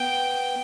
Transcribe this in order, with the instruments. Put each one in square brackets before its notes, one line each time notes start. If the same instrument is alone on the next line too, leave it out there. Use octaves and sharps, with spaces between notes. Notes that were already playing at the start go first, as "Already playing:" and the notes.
Already playing: [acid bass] B3 [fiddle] G5